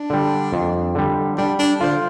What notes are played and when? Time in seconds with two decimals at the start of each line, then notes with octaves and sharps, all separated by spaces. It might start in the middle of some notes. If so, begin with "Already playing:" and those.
Already playing: D4
0.10 D3 G3
0.53 F2
0.95 D3 G3
1.38 G3 D4
1.59 D4
1.80 D3 F4 C5